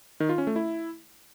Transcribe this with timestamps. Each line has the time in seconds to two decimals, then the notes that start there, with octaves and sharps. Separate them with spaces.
0.20 D#3
0.29 F4
0.38 C#4
0.47 A3
0.56 E4